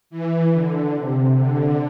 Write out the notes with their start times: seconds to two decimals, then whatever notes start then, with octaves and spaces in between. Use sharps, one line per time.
0.10 E3
0.52 D3
0.94 C3
1.36 D3